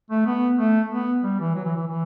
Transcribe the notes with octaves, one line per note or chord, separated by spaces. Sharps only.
A3
B3
A3
B3
G3
E3
F#3
E3
E3
E3